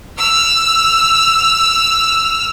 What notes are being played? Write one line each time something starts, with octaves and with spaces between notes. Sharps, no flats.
E6 F6